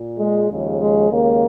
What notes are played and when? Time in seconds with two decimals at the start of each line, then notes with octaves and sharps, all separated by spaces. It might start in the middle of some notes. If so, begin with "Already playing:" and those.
Already playing: A#2
0.18 G#3
0.48 D#2 C#3 F3 G#3
0.79 G#3
1.10 D#2 C#3 G#3 A#3